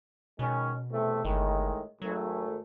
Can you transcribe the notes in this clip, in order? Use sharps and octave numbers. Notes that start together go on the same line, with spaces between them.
B2 D#3 G#3 C#4
E2 C3 A3
G1 A2 D#3 G#3
G#1 F#3 A3